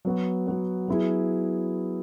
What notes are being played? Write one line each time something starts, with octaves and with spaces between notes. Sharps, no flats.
F#3 B3 F#4
F#3 B3 F#4
F#3 B3 E4 G#4